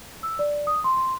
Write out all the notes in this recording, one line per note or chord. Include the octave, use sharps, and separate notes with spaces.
E6
D5
D#6
C6
C6